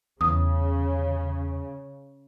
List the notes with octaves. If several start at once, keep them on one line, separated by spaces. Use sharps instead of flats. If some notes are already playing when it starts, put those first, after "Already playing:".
E2 C#3 D#6